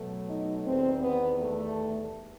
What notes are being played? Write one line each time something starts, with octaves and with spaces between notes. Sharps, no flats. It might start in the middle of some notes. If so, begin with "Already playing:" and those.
Already playing: B2 F#3 A3
D#4
E2 D#3 G3 C4
B3
A3